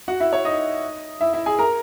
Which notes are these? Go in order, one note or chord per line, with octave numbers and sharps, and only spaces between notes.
F#4 F#5
E4 E5
C#5
D#4 D#5
E4 E5
E4 E5
G#4 G#5
A#4 A#5